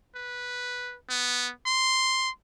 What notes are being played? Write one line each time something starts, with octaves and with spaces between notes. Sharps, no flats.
B4
B3
C6